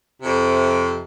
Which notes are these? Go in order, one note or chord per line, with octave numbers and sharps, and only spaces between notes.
F2 C3